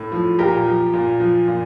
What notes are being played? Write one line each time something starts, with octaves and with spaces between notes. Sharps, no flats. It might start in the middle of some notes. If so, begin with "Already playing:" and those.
Already playing: A2
F3
A#2 G4 A#4
F3
A#2
F3
A#2